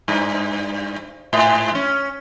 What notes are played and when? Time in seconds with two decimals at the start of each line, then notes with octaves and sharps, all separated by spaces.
0.08 G2
1.33 G#2
1.75 C#4